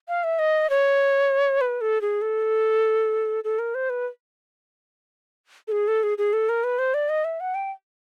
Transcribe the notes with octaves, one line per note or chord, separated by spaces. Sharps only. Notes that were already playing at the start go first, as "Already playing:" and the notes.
F5
E5
D#5
C#5
B4
A4
G#4
A4
A4
A#4
C5
B4
A4
G#4
A4
G#4
G#4
A4
A#4
B4
C5
D5
D#5
E5
F#5
G5